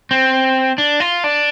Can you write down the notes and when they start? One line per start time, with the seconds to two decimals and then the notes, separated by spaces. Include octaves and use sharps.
0.11 C4
0.78 D4
1.00 F4
1.24 D4